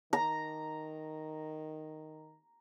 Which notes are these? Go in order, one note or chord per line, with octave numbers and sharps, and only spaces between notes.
D#3 A#5